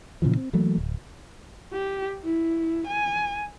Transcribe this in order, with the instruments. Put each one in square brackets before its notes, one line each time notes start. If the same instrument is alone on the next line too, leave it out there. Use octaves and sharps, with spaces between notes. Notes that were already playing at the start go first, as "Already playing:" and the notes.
[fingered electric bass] A#2 C#3 E3 F3
C4
E3 F#3 A3 A#3
D1
[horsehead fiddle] G4
E4
G#5